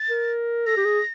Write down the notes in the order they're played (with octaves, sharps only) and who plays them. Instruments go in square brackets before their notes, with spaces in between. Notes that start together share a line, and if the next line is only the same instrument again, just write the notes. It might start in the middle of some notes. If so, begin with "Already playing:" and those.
Already playing: [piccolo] A6
[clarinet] A#4
[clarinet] A4 [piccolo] A#6
[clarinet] G4
G#4